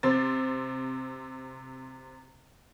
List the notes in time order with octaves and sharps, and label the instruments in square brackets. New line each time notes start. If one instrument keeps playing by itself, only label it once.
[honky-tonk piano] C3 C4 A6